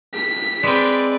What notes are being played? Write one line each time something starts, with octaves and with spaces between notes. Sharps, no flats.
B6
G#3 C4 B4 D5